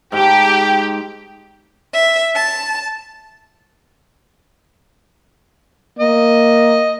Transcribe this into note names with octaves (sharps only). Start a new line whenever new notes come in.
G#2 G4 G5 A5
E5
A5
A#3 D#5